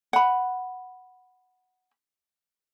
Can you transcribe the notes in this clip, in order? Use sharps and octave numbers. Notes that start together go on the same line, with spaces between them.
F#5 B5